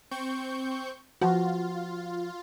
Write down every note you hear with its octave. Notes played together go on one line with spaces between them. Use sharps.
C4 C#6 G6
F3 F4 F#4